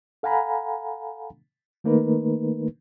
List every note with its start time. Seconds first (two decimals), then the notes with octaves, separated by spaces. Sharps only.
0.23 A4 F5 F#5 G#5 A#5 B5
1.84 D#3 A3 A#3 D#4 A#4 B4